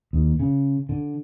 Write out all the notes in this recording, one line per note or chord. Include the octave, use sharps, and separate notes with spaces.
D#2
C#3
D3